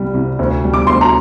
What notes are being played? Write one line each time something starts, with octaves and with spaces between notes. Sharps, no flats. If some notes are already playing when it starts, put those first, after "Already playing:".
Already playing: C2 G3
C2
D2
G3
D6
D2 C6
A#5